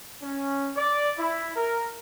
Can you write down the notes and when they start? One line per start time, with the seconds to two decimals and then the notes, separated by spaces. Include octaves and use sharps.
0.22 C#4
0.76 D5
1.17 E4
1.56 A#4